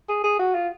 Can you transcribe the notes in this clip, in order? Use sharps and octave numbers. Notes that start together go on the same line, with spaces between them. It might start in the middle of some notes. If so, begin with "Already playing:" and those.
G#4
G#4
F#4
F4